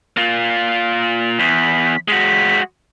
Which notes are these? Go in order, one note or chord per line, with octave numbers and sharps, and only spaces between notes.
A#3 F4
E2 B6
G#3 F#4 B6